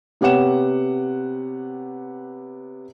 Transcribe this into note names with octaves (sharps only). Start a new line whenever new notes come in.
C3 B3 G4 C#5 F#5 E7